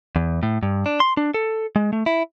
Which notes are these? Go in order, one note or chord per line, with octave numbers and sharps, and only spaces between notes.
E2
A2
G2
D4
C6
D4
A4
G#3
A3
E4